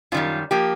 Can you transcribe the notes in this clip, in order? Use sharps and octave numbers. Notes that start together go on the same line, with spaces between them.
F#2 D#3 G3 F4
F3 A#3 G4